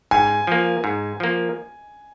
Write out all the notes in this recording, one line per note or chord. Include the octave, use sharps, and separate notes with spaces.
G#2 G#5
F3 A#3
G#2
F3 A#3